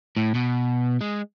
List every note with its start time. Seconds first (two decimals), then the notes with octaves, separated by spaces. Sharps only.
0.17 A2
0.35 B2
1.01 G#3